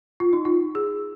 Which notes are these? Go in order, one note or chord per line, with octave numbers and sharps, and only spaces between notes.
F4
D#4
F4
G#4